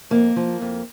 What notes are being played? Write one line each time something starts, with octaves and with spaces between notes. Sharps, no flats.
F2 A#3
F3
F2